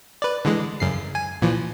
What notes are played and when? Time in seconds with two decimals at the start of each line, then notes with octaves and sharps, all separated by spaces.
0.22 B4 D5
0.45 D3 E3 G#3
0.80 F#2 C#3 C7
1.15 G#5
1.42 A#2 E3 F3